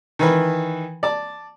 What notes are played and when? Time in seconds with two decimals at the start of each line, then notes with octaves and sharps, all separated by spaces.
0.19 D#3 E3 B4
1.03 D5 A5